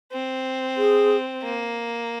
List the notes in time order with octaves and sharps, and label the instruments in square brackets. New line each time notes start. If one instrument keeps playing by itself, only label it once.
[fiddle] C4
[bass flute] G#4
[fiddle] A#3